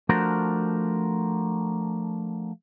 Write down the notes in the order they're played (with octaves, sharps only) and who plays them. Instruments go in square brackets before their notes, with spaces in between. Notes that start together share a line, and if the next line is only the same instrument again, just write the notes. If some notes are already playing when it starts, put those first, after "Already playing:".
[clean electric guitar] F3 A3 D4 F#4 A#4 C5